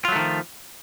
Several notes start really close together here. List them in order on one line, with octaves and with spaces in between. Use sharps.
F4 F#3 A3 D#3 F3